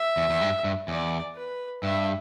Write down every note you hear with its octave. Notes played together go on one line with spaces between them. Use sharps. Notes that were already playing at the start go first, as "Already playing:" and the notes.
Already playing: E5
E2
E2
G2
G2
E2 D5
B4
G2 E5